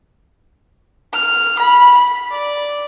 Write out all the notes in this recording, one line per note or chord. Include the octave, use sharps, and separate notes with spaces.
F6
B5
B5
D5